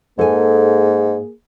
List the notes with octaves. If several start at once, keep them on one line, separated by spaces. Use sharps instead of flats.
G#2 A#3 G#4 A4 G#5